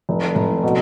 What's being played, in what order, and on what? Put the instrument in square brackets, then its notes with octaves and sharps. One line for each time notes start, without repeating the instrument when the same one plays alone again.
[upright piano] F1
F1
B2